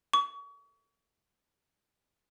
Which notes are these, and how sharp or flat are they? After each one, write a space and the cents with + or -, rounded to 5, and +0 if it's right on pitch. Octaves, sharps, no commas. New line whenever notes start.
C#6 +35